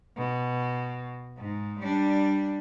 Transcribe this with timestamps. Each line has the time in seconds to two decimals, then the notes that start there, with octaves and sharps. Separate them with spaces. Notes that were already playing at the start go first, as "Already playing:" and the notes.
0.17 B2
1.38 G#2
1.80 G3 D4